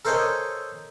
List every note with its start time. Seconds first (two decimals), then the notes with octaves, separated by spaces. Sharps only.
0.05 A4 A#4 C5 C#5 D#5 G#5